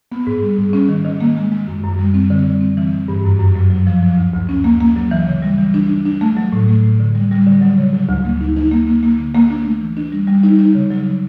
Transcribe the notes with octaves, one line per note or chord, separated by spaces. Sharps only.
B3
G#2
G3
G#2
C#4
D#3
D#3
A#3
G#3
G#3
F#2
F#2
G3
C4
D3
G3
C4
E3
E3
G2
F#2
F#2
F#3
F#3
F3
F3
D2
D2
C#4
A#3
A#3
F#3
E3
C#3
G3
E3
D4
D4
D4
A3
F#3
A2
A3
A2
D3
G3
G3
D3
F#3
C#3
F#3
D2
A#3
D#4
D#4
A#3
A#3
A#3
D3
A#3
D4
A3
E3
D4
G3
G3
D#4
D#4
C#3
F#3
C#3